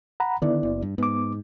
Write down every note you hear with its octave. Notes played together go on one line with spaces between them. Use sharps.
F#5 A#5 B5
D3 D#3 B3 E4 D5
F#1
G2
G#2 B3 D6